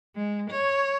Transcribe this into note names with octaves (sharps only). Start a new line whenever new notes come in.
G#3
C#5